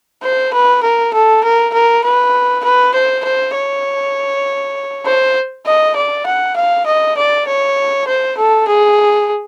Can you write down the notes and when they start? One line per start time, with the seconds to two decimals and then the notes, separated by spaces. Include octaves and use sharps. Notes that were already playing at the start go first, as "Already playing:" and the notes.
0.23 C5
0.53 B4
0.83 A#4
1.13 A4
1.43 A#4
1.73 A#4
2.04 B4
2.64 B4
2.94 C5
3.24 C5
3.54 C#5
5.05 C5
5.66 D#5
5.96 D5
6.26 F#5
6.56 F5
6.86 D#5
7.17 D5
7.47 C#5
8.07 C5
8.37 A4
8.67 G#4